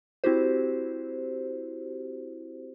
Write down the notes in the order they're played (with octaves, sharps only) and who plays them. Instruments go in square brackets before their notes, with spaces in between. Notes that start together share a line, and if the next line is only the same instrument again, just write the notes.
[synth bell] C4 E4 F#4 G4 C5